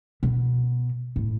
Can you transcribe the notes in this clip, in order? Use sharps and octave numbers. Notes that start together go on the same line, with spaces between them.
B2
A2